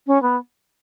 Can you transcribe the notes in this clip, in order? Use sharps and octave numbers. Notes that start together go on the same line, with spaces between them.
C#4
B3